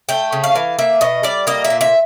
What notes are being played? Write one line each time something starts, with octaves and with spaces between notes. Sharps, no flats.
A3 G5
C#3
F5
E3
A#3 E5
B2 D#5
G3 D5
A#3 D#5
E5
A#2
E5